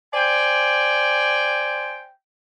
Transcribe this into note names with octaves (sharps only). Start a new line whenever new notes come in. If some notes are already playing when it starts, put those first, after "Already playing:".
C5 D5 G5 G#5